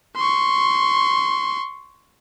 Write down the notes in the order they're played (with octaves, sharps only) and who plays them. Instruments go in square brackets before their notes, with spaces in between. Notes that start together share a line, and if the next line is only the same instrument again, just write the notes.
[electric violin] C6 C#6